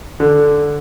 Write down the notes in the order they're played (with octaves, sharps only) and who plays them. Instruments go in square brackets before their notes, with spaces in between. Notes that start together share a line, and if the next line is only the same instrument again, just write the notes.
[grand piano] D3